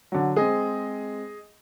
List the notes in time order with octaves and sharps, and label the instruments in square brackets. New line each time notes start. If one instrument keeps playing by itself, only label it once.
[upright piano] D3 F#3
[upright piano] G#3 C4 [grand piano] G#4 D#5